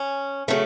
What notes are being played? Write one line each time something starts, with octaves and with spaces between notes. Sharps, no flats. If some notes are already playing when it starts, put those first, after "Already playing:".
Already playing: C#4
C#3 F#3 A3